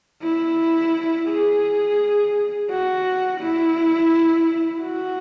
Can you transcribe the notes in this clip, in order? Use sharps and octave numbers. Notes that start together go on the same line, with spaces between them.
E4
G#4
F#4
E4
F#4